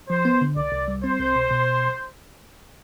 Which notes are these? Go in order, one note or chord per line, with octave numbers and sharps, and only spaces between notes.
F3 C5
B3
D3
C2 D5
C2
G3
C4 C5
C2
B2
B2